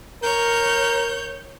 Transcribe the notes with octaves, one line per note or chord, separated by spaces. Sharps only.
A#4 C#5 G6